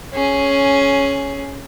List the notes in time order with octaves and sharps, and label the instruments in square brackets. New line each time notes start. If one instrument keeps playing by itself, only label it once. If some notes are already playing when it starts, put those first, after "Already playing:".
[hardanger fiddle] C#4 G#4